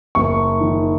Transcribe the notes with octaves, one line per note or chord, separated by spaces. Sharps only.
F#1 C#6
D#3